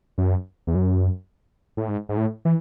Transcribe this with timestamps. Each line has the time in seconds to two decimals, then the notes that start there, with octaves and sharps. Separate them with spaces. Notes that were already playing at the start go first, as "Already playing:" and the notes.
0.18 F#2
0.67 E2
0.75 F#2
1.77 A2
1.88 G#2
2.09 G#2
2.17 A2
2.45 E3